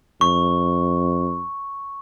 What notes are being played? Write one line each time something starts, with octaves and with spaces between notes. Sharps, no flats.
F2 C#6